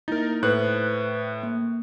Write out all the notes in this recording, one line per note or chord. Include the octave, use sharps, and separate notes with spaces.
A#3 D#4 E4 A#4 A6
A2 B4 C5 F#6
A#3